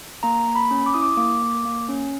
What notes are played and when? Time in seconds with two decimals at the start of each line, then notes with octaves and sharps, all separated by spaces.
0.23 A#3 A#5
0.47 A#3
0.55 B5
0.71 C#4
0.86 D6
0.94 E4 D#6
1.02 D6
1.17 A#3 D6
1.42 A#3
1.65 A#3
1.89 C#4